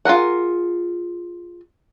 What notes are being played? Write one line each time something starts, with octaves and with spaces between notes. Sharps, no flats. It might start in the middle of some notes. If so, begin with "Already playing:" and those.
F4 G#4 A#4 F#5